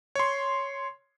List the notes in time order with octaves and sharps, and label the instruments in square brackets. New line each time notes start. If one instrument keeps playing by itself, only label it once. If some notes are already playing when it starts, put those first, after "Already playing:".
[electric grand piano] C#5 C6